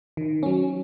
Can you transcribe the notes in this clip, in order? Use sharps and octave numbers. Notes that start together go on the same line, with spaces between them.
D#3
F#3 C#4